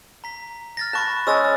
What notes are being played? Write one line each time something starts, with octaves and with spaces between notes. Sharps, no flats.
A#5 B6
F6 A6 A#6
A5 B5 C#6 F#6
G#3 C#4 D#6 E6 A6